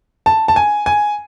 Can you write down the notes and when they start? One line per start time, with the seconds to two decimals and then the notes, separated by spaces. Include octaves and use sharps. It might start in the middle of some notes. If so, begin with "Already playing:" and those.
0.26 A5
0.48 A5
0.56 G#5
0.86 G#5